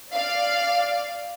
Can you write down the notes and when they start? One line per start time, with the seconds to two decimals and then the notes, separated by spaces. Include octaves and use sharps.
0.12 D5 F5